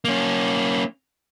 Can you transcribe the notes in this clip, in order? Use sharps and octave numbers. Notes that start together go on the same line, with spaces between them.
A#3 C#4